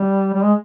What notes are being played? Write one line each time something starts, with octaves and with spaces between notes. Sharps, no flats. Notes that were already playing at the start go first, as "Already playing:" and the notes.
Already playing: G3
G3
G#3